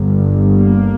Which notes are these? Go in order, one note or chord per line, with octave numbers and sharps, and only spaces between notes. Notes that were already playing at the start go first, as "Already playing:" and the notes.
Already playing: G1 G2
A#3